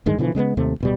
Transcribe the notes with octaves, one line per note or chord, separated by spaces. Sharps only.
D1 G2 D#3 G#3
B2 D3 E3 F3
C#3 G#3 A#3 B3
D#2 C3 A3
D1 B2 G3